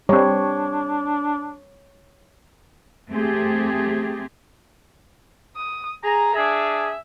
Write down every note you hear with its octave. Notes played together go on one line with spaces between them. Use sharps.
G3 C4 D4 C#5
A3 C4 G4 G#4
D#6
G#4 A#5
D4 G#4 E5